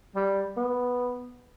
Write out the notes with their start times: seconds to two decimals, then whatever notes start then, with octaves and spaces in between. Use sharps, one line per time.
0.16 G3
0.57 B3